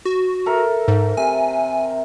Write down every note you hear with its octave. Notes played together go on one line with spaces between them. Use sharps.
F#4
A4 A#4 E5
G#2
C3 G#5